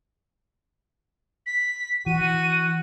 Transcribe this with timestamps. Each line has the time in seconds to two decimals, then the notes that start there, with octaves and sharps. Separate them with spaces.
1.46 B6
2.06 E3 F#4 D#7